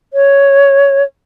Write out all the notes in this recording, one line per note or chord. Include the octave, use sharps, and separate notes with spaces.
C#5